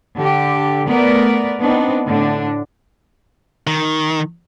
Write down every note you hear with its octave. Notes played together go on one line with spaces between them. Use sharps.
D3 G4
A3 B3 A#4 B4 D5
B3 C4 D4 D#4
A2 D3 D4
D#3